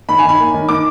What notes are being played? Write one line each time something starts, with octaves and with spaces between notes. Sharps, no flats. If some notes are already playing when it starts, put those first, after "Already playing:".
D#3 B5
G#5
D#3
B5
A#3
D#3
D#3 D6